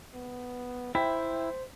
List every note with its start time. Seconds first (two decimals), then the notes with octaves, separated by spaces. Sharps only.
0.14 B3
0.95 E4 C5 E5 G5 B6